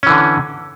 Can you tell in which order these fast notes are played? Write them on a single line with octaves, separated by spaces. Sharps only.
C#4 E3 D3